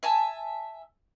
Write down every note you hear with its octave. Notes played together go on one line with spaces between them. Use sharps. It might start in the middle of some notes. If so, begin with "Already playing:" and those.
E5 G#5 A5